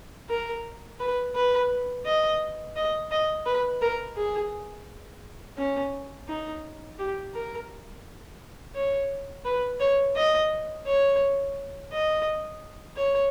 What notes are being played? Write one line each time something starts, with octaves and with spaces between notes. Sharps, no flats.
A#4
B4
B4
D#5
D#5
D#5
B4
A#4
G#4
C#4
D#4
G4
A#4
C#5
B4
C#5
D#5
C#5
D#5
C#5